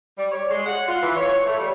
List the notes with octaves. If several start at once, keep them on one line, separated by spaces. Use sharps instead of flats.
G3
C#5
G#3
F#5
F4
E3
C#5
A3
G3